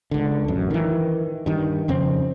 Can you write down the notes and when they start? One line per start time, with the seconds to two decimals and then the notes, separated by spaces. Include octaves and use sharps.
0.11 C#2 D3
0.48 A1 F#2
0.71 D#3 E3
1.46 G2 D#3
1.88 F2 C#3 C4